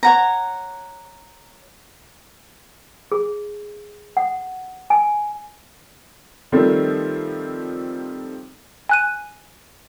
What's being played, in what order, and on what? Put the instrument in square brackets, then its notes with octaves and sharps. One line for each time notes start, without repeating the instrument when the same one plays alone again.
[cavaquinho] C#5 F#5 A#5
[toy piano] G#4
F#5
G#5
[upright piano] D#3 F3 G3 A3 C4
[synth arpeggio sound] G#5 F#6 D#7